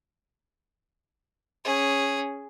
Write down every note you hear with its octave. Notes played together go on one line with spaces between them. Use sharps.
C#4 G#4